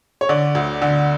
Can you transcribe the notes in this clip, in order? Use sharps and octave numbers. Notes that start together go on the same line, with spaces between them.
C#5
D3 D5
D2
D3